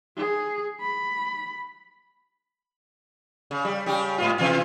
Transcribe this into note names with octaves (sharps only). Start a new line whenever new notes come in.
G#4
B5
C#3
G3
C#3 G3 G4
G#2 B3 F4
B2 E3 F4